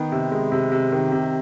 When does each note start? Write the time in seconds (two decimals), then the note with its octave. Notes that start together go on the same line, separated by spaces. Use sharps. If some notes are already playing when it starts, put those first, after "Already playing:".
Already playing: D#3 B3
0.12 C3
0.32 G#3
0.52 C3
0.72 C3
0.92 D#3
1.12 C3